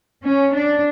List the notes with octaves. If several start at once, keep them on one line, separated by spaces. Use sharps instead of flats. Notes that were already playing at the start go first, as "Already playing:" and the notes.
C#4
D4